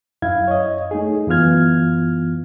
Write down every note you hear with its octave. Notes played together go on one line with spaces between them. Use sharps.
F#2 E4 F5 G#6
C#5 D#5
A3 D#4 G#4
F#2 E3 B3 F4 F6 G#6